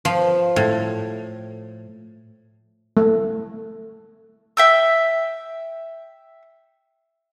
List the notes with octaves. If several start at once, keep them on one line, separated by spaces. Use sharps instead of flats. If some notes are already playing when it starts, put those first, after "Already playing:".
F3
A2
A3
E5 G5 E6